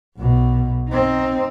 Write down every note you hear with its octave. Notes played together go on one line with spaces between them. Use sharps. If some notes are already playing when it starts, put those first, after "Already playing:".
B1 B2
C4 D#4